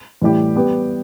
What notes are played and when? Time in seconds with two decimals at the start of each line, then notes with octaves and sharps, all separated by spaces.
0.22 A2 E3 G3 E4 G4
0.56 G3 B3 G4 B4